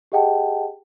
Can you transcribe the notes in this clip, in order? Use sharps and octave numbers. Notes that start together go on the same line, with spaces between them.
G4 G#4 D#5 F#5 G5 A5